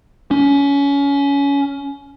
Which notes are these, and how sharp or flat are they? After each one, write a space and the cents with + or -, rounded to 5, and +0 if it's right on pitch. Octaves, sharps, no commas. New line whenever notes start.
C#4 +25